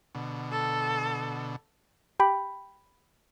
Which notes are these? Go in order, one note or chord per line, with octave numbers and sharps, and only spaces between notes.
B2 D3
A4
G4 G5 B5